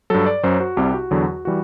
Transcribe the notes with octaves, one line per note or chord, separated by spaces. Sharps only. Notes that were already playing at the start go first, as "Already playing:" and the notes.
G2 F#3 A4
D5
F#2 F#3 C5
F#4
C2 C3 G3 G4
F#4
E2 D3 F#3
E3 G3 F#4